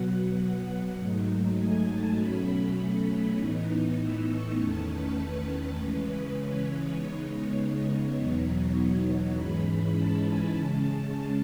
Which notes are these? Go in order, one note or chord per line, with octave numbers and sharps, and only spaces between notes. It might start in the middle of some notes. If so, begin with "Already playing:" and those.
Already playing: B2 F#3 B3 F#5
G#2 F#3 A3 D#4
G#5
A5
B2 F#3 A3 C#4 B5
A2 E3 B3 D#4
E6
C#6
E2 D#3 A3 C#4 A5
B4
B4
C#3 E3 G#3 C#4 B4
C#5
B4
C#3 G#3 B3 D#4 C#5
E2 B2 F#3 B3 D#4
G#2 E3 G#3 C#4 B5
A5
G#5
C#3 G#3 C#4 A5